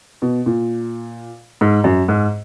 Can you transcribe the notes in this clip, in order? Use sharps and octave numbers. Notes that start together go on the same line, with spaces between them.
B2
A#2
G#2
F#2
G#2